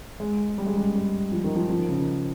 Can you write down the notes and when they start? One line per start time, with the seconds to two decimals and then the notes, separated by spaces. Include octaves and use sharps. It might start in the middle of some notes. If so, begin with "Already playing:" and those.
0.20 G#3
0.58 G3
0.66 G#3
0.77 G3
0.95 G3
1.32 F3
1.44 D#3
1.55 F3
1.70 F3
1.79 D#3
1.89 C#3
1.99 D#3